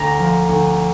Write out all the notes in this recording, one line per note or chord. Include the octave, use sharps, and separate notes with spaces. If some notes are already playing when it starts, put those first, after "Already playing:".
Already playing: D2 A#5
F3
D2